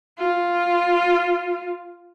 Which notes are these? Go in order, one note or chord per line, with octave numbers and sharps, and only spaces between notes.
F4